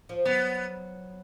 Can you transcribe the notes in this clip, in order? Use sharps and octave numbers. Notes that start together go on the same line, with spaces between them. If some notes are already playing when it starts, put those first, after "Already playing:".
F3
F#3 B3